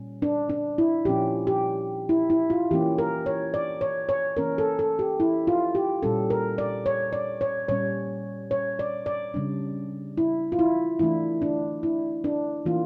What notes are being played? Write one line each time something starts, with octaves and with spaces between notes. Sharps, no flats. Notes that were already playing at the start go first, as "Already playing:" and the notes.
Already playing: A#2 G3 C#4
D4
D4
E4
A#2 F3 C#4 G4
G4
E4
E4
F4
E3 A#3 C#4 G4
A#4
C#5
D5
C#5
C#5
E3 A#3 C#4 A#4
A4
A4
G4
E4
F4
G4
A#2 G3 C#4 A4
A#4
D5
C#5
D5
C#5
A#2 G3 C#4 C#5
C#5
D5
D5
C#3 G3 D4
E4
F4
E4
E3 A3 D4 E4
D4
E4
D4
E3 A#3 D4 F4